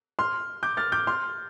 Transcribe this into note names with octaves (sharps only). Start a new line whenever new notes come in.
C6 F6
D6 G6
F6 A6
D6 G6
C6 F6